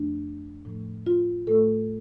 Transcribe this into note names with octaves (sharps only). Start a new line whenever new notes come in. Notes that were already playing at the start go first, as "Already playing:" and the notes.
Already playing: F2 F3 A3 D4
A2 F3 A3
F4
A2 A3 A4